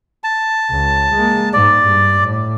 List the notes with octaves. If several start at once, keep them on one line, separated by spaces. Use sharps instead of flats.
A5
C#2
G#3 A#3
G#2 D5
G2
A2